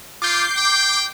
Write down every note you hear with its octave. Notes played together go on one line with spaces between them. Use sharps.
F4 D6 G6 C7
G5